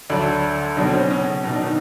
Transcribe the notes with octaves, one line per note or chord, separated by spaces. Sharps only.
D2 D3 F#3 D4
B1 B2 D3 F#3 D4
C4
C#3 C#4
C#3 C#4
B1 B2 F#3 D#4
D4
D#3 D#4